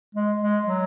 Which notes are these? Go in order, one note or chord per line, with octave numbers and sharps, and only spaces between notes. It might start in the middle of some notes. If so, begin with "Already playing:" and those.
G#3
G#3
F#3